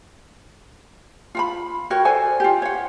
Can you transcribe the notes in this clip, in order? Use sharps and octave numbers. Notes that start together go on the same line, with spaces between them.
F4 F#5 B5
F#4 A#4 C#5 G5
A4 C5 D5 G#5
F4 G4
C#5 F#5